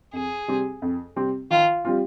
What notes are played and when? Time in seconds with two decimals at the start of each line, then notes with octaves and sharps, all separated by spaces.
0.13 F2 G#4
0.48 C3 G3 C4 G4
0.82 F2
1.16 C3 G3 C4 G4
1.50 D#3 F4
1.85 G3 C4 F4